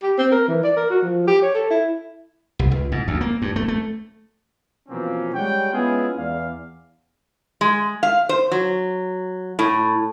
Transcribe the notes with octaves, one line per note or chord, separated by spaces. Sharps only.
G4
C4
A#4
E3
D5
A#4
F#4
F3
G4
C#5
A4
E4
C2
C#2
G#2
D2
A#3
G2
A3
A3
B2 E3 F3 A#3 C4 C#4
G3 G#3 C#5 F#5 G5
G#3 B3 C#4 E4 F4 G#4
E2 D5 F5
G#3
F5
C5
F#3
A2